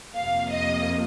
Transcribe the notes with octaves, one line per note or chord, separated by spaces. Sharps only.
F2 C3 F3 A#3 F5
D#5